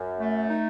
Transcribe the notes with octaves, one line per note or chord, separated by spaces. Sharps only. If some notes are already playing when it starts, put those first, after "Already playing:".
Already playing: F#2
A3
D#4